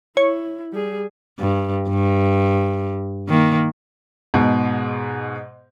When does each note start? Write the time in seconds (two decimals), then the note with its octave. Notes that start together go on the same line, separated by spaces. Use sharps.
0.17 E4 C#5
0.73 G3 G#4
1.39 G2
1.89 G2
3.29 D#3 A#3
4.34 G#2 B2